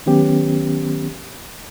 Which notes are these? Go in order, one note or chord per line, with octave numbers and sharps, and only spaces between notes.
D#3 F#3 B3 C#4 G4